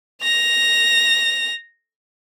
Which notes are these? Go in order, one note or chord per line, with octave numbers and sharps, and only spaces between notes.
A#6 F7